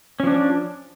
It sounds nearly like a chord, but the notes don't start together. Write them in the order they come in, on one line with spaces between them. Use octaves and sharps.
C#4 F3 D4